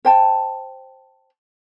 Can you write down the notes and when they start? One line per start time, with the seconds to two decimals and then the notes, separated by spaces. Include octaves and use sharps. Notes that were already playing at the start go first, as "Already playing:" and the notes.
0.05 C5 G5 A5